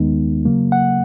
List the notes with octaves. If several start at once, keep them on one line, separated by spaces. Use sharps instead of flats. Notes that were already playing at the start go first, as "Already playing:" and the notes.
Already playing: D#2 D#3 G#3 B3 D#4
C#3 F#3 A#3
F#5